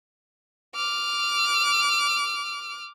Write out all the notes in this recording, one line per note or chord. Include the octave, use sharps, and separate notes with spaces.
D6 F6